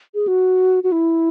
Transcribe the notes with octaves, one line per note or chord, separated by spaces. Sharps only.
G#4
F#4
F#4
E4